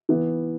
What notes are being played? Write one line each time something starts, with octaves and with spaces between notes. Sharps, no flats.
E3 B3 E4